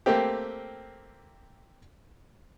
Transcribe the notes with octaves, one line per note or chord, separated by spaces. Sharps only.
A3 A#3 C4 G4